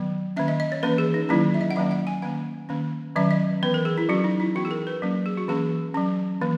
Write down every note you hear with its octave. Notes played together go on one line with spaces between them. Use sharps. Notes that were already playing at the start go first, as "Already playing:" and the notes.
Already playing: D#3 F#3 B3
D#3 A#3 C#4 E5
D#5
D#5
C#5
E3 A#3 C#4 B4
G#4
D#4
D#3 F#3 A#3 C#4 E4
E5
D#5
F#5
D#3 F#3 A#3 C#4 E5
F#5
G#5
D#3 A#3 C#4 F#5
D#3 A#3 C#4
D#3 F#3 C#4 E5
D#5
E3 B3 B4
A#4
G#4
E4
F#3 C#4 F#4
D#4
E4
E3 B3 F#4
G#4
A#4
B4
F#3 A#3 C#4
G#4
F#4
E3 A#3 C#4 G#4
F#3 C#4
E3 A#3